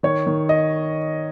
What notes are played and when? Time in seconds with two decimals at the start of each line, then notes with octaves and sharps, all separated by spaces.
0.03 D#3 C#5
0.27 D#3
0.49 D#5